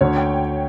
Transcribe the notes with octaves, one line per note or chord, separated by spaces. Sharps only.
D2 C#5
G5